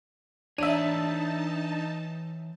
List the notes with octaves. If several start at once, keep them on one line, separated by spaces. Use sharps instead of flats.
E3 D4 D#4 C#5 E5 A5 D#7